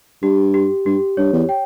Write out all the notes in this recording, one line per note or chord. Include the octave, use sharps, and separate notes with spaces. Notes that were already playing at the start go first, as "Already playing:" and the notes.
G2 G4
G4
G2 G4
G2 C#5
E2
G5